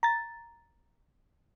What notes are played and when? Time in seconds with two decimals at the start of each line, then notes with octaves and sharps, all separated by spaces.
0.03 A#5 A6